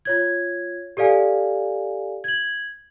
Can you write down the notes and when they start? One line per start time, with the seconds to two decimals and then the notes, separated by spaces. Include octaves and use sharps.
0.05 F4 C#5 G#6
0.97 G4 A4 D5 F5 G#5
2.24 G#6 F#7